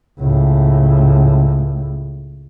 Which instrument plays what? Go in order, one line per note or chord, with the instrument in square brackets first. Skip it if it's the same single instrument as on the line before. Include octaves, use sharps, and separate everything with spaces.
[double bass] C#2 A2